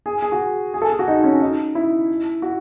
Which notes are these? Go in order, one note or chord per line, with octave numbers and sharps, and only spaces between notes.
G#4
G#4
F#4
G#4
A4
G#4
F#4
D#4
C#4
D#4
E4
F#4